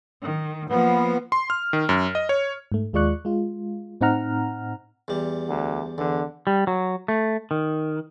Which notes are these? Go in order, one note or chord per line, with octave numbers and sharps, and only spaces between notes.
D#3
F3 A#3 B3
C6
F6
D#3
F#2
D#5
C#5
G#2 A3
D#2 G#3 F4 D5 C#6 F#6
G#3 F4
A2 C4 D#4 F#5 A#5 F6
E2 G3
D2
E2 D3
G3
F#3
A3
D#3